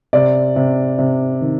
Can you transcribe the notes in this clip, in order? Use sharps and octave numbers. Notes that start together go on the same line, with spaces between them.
C3 D5
C3
C3
D#3